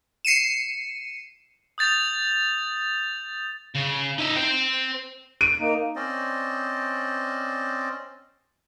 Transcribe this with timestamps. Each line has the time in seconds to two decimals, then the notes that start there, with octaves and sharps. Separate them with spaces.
0.25 C7 C#7 D#7 E7
1.78 D#6 G6 A6 F7
3.75 C#3
4.19 D#4 E5
4.36 C5 G5
5.41 D7 D#7
5.60 A#3 D#4
5.96 C4 C#4 C5 D5 D#5